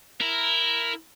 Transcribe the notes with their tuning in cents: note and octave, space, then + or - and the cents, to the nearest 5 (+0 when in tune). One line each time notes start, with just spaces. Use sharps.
E4 +0 A#4 +0